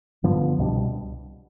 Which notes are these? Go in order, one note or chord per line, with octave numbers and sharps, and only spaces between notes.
G2 D3 F3 B3
C2 B2 G3 D4